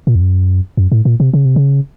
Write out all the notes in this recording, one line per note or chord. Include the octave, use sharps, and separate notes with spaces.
A#2
F2
F#2
F#2
A2
A#2
C3
C#3
C3
C#3